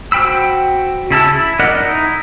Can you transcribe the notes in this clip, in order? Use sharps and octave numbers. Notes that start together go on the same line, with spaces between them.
F#4 C5 G5 B5 E6
C#3 E4 A5 E6
E4
A#4 D5 D#5 F#5 F#6
D#4 E4